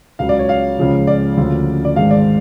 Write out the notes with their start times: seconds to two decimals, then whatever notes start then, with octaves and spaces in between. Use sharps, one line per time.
0.19 C#2 C#3 F#3 F5
0.29 D5
0.39 C#5
0.49 F5
0.79 C#2 C#3 F3 G#3
1.07 D5
1.37 D2 C#3 F3
1.85 D5
1.96 G#1 G#2 G#3 F5
2.11 D5